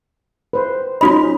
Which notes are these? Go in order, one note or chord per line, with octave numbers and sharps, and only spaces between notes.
B4 C5
C#4 D#4 F4 F#4 D#5 B5